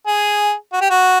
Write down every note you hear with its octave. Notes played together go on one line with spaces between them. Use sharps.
G#4
F#4
G4
F#4